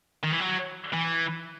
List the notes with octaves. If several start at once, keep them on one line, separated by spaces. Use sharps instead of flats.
D#3
E3
F#3
E3